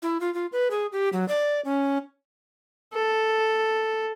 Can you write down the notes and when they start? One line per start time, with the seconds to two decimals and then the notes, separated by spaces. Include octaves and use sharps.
0.03 E4
0.20 F4
0.34 F4
0.52 B4
0.71 G#4
0.92 G4
1.13 F#3
1.28 D5
1.65 C#4
2.93 A4